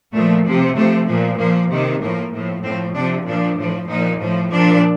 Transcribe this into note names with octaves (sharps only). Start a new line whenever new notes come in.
A#2 F3 A3
C3 F3
C3 F3 A3
A#2 F3
A#2 F3 A#3
C3 D#3
A2 F3 A#3
A2 F3
A2 F3 C4
C3 F3 D4
A#2 F3 D4
A2 F3
A#2 F3 D#4
A2 F3
A#2 F3 D4